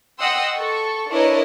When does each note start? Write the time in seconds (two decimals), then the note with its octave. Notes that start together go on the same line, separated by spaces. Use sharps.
0.19 D#5 F#5 G5 C6 D#6 E6
0.55 A4 C#6
1.09 D4 E4 A#4 B4 C#5 D#5